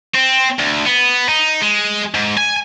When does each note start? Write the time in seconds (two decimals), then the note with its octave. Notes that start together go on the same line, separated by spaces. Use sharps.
0.14 C4
0.59 D2
0.86 B3
1.29 D#4
1.62 G#3
2.15 G#2
2.38 G#5